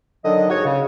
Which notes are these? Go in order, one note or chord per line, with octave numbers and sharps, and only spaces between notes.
D3 D#3 F#3 D4 D#5
G#2 F#4 C#5
C#3